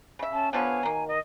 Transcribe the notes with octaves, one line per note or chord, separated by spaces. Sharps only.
C#3 E5
C#4 A5
D3 F3 B3 B4 C#5 F5 G#5
D#3 F#3 A#3
D#5